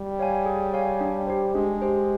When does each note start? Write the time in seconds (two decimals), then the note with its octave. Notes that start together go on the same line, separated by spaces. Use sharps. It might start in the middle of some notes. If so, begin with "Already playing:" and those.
Already playing: G3
0.19 C#5 F5 G#5
0.46 G#4
0.74 C#5 F5 G#5
1.01 D4
1.27 G4 C5
1.54 G#3 D4
1.82 G4 C5